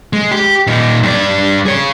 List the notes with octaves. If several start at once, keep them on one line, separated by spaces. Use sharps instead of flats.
G#3
G4
A#2 D#4
G2 D5
G#4 C#5